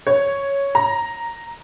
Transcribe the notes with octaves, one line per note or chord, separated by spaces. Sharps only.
C#5
A#5